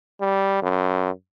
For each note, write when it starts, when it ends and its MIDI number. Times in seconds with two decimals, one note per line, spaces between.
0.21 0.61 55
0.63 1.10 42